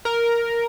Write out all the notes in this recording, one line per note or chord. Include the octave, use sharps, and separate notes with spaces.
A#4